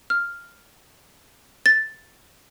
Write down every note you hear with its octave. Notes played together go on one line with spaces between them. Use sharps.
F6
A6